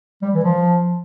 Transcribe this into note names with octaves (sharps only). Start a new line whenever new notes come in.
G3
E3
F3